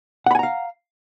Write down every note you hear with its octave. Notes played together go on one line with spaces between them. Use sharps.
F5 F#5 G#5 A#5 B5